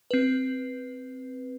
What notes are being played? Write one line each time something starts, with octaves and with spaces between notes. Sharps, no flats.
C4 B4